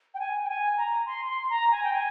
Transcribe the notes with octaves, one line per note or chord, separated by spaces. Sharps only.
G5
G#5
G5
G#5
A#5
C6
C6
A#5
G#5
G5
G#5